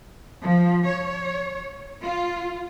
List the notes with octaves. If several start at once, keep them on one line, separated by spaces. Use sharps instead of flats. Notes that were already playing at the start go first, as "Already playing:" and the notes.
F3
C#5
F4